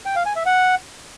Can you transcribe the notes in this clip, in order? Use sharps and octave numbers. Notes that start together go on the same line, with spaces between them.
G5
F5
G#5
E5
F#5